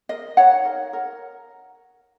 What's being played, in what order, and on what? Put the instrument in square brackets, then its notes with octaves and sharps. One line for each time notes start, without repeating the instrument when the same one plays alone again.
[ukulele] A#4 D#5
D#4 C#5 F#5
A#4
A#4